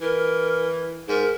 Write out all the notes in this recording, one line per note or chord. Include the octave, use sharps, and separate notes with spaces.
E3 A#4
G#2 A#4